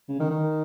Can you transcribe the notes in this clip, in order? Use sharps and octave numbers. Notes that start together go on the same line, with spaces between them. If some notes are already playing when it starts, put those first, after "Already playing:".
C#3
D#3
D#3